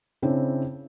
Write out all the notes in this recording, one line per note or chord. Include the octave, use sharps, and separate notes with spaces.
C#3 C4 D4 E4